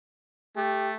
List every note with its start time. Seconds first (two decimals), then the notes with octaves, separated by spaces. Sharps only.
0.56 A3 G4